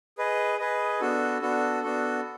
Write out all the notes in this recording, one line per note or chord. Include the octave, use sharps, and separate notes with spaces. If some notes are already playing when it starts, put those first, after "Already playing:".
G#4 B4 D#5
G#4 B4 D#5
B3 D4 F#4 A4
B3 D4 F#4 A4
B3 D4 F#4 A4